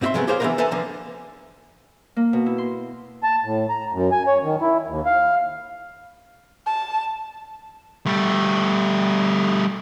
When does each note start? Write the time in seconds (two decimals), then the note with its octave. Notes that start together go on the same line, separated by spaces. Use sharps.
0.01 G#2 C4 F4 G4 E5 C6
0.14 F3 F#3 G#3 A3 B3 C4
0.27 G4 G#4 A#4 C5 C#5 F5
0.40 E3 G#3 B3 C4 D4 A#4
0.58 A4 B4 C5 E5 G#5 A#5
0.71 D3 F3 A#3
2.16 A#3
2.33 B2
2.46 E4
2.58 C6
3.23 A5
3.44 A2
3.69 A#5
3.92 F#2
4.12 G#5
4.27 C#5
4.43 D#3
4.61 E4
4.88 D#2
5.06 F5
6.66 A5
8.06 G3 A3